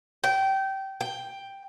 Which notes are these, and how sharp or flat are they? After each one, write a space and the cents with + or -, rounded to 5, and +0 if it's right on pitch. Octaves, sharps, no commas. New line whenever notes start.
G5 -20
G5 +5